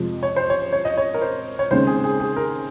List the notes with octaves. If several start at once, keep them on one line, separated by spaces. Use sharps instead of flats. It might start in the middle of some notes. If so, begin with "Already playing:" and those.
Already playing: F2 C3 F3 G#3
C#5
C5
C#5
C#5
D#5
C#5
A#4
C5
C#5
D#2 C#3 G#3 C4 C5
G#4
G#4
G#4
A#4